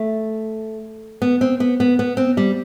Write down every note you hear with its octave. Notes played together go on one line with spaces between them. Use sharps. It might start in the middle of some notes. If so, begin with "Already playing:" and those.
Already playing: A3
B3
C4
B3
B3
B3
C4
G3